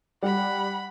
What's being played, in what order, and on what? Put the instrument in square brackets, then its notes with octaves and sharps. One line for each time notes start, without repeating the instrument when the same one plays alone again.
[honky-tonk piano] G3 [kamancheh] F#5 B5